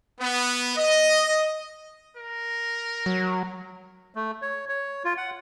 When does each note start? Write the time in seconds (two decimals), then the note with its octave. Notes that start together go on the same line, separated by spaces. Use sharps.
0.20 B3
0.76 D#5
2.17 A#4
3.06 F#3
4.14 A3
4.42 C#5
4.69 C#5
5.05 F4
5.17 F#5